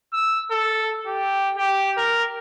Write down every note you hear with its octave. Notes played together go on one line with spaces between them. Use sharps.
E6
A4
G4
G4
A#4